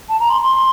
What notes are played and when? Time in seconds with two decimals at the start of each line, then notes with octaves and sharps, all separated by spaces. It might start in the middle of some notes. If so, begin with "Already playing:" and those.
0.09 A5
0.20 A#5
0.30 C6
0.41 C6